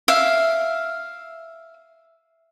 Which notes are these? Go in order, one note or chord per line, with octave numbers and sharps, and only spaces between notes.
E5 F5